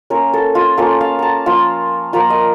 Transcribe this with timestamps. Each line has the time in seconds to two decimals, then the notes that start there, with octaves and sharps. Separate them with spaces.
0.10 A#3 C#4 F4 A#4
0.34 A4
0.55 F4
0.78 A#3 C#4 F4 A4
1.01 F5
1.19 A5 A#5
1.46 F3 A#3 F4
2.13 F3 A#3 F4 A#5
2.30 D#5